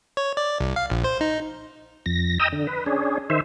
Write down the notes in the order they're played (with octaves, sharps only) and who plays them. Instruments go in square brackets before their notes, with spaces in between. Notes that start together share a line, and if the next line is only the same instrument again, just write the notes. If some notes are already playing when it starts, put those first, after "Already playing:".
[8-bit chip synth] C#5
D5
C2
F5
A#1
C5
D#4
[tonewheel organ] F2 A#6
D#5 G5 A#5 D#6 E6
D3
B4
C#4 D4 G#4
D#3 C5 E5